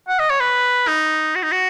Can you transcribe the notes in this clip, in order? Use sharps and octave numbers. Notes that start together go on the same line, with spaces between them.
F#5
D#5
C#5
B4
D#4
F#4
D#4
F#4